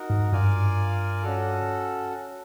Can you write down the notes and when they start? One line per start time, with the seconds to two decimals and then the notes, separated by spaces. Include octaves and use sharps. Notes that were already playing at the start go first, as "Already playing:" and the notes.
Already playing: D#4 F#4 A#4
0.10 G#2
0.32 G2 F4 A#4 D5 F5 G#5
1.23 C#4 F#4 A4